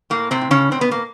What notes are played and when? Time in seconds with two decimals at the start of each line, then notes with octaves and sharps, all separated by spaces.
0.10 A2 A#3
0.31 C3 C4
0.41 A2
0.51 C#3 C#4
0.71 B2 C4
0.81 B3
0.91 A#3